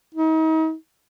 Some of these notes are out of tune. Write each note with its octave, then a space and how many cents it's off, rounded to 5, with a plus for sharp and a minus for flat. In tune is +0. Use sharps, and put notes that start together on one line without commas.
D#4 +40